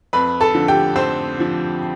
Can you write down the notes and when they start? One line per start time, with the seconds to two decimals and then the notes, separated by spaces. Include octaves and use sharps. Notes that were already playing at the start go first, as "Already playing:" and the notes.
0.13 F2 B4 B5
0.41 A4 A5
0.55 D3 F3
0.68 G4 G5
0.95 F2 C4 C5
1.37 D3 F3